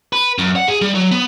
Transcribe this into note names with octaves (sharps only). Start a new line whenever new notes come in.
B4
F#2
F#5
G#4
G3
F#3
B3